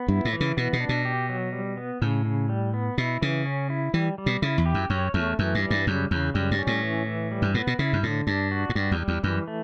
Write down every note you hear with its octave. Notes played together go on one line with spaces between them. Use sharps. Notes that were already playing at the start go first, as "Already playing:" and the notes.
Already playing: B3
G2 E4
A2
E3
C#3
B2 B3
B2
D4
B2
G4
F#3
G3
B3
A2 C#3
C#3
G3
B3
B2 E4
C#3 E3
C#4
E4
E3 G3
G3
B2
C#3 E4
E2
G4
F#2
F#2 C#5
E2 A3
F#2 E3
G2
G3
G2
F#2 C#3
E2 C#3
F#2 G3
G2
C#4
A2
E3
E3
G3
G2
A2 B3
B2
C#3 E4
G2
A2 D3
G2 D4
F#4
A2
G2 G3
E2
G3
E2
F#2 E3
A3